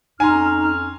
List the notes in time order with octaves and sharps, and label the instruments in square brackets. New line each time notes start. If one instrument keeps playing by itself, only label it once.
[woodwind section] F2 C#4 F6 [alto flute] D#4 [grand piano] G#5 A#5 C6